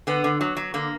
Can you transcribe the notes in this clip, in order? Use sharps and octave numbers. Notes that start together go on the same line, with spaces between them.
D3 B3
D3
F#3
F#3
D3 A#3